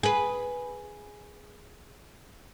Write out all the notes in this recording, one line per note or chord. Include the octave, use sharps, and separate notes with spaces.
G#4 B4